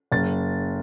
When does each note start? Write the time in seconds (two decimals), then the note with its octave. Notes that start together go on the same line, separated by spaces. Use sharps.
0.12 F#1 A6